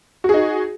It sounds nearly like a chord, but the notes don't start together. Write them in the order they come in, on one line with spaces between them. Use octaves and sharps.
F#4 G#4 D#4